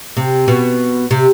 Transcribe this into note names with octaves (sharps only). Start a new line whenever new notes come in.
C3
B2
C3